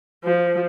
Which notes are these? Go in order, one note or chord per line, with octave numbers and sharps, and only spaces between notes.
F3